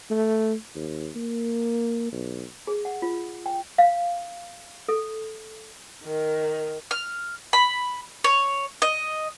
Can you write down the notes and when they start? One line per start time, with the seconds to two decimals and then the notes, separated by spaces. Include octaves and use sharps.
0.10 A3
0.75 D#2
1.16 A#3
2.13 B1
2.67 G#4
2.85 F#5
3.02 F4
3.46 G5
3.78 F5
4.89 A4
6.04 D#3
6.91 F6
7.53 B5
8.24 C#5
8.82 D#5